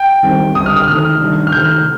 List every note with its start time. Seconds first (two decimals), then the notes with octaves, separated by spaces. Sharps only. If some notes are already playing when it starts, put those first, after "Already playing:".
Already playing: G5
0.23 D#3 G3 C4
0.55 D3 G3 D4 D#6
0.66 F6
0.76 D#6
0.88 C3 D#3 A3 F6
1.20 D#3 G3 D4
1.47 F6
1.52 C3 D#3 A3 G6